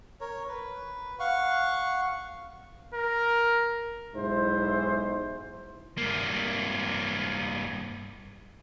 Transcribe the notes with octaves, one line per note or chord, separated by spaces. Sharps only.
A#4 C#5
B4
F5 F#5 C#6
A#4
B1 G#2 E4 C5
G2 A#3